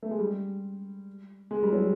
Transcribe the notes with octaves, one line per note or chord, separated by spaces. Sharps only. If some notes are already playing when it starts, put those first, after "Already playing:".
A3
G#3
G3
G#3
G3
F#3